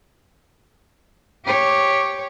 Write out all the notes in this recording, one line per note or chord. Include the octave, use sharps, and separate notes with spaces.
G4 C#5